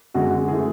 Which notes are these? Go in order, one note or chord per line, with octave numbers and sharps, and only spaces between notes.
F#2 D3 G#3 F#4
E3 A3 G#4